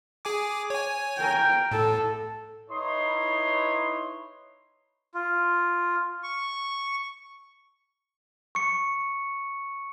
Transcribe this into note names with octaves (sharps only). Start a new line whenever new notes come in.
G#4 G#5 D6
C#5 G#5
A#4 G5
A2 A4
D#4 E4 B4 C#5 C6 D#6
F4
C#6
C#6 C#7